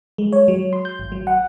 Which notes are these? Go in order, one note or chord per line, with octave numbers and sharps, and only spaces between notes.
G#3
C#5
F#3
C6
G6
G#1
F#3
F#5